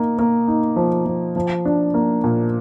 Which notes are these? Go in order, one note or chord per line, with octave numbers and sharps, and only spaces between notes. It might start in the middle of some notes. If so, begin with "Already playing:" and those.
Already playing: A#3 D#4
A#3
D#4
F3
F3
F3
D4
A#3
A#2